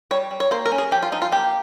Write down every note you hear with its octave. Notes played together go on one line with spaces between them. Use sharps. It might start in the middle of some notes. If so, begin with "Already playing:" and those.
G3 C#5
G3
C#5
A#3 C5
A#4
C#4
G#4
F3 G4
F4
F3 D#4
F4
A#3 G4